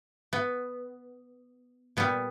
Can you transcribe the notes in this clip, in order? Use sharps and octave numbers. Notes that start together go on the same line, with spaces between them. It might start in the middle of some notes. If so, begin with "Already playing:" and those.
B3
A#2 G3 B3